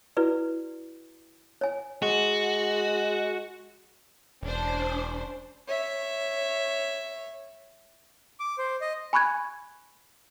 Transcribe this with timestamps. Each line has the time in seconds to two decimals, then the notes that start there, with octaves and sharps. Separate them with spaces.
0.17 E4 F#4 B4 D5
1.61 C#5 G#5
2.02 G#3 F#4
4.43 E1 C#4 D4 C5
5.67 C#5 E5
8.40 D6
8.58 C5
8.81 D#5
9.13 G#5 B5 C#6 F#6 G#6